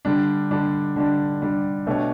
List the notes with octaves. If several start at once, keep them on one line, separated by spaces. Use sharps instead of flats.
D3 G3 D4
D3 G3 D4
D3 G3 D4
D3 G3 D4
B2 A3 D4 G4 C#5